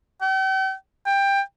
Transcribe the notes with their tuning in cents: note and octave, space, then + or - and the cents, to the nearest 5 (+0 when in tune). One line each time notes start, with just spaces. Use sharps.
G5 -45
G5 +15